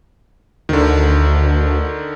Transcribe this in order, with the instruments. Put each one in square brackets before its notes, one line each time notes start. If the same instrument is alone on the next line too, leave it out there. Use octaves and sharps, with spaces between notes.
[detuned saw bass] D2 [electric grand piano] D3 D#3